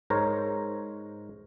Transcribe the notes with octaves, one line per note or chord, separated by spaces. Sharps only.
G#2 A#4 C5 C#5 A#5